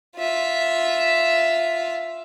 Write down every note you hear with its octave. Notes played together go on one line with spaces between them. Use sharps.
F4 E5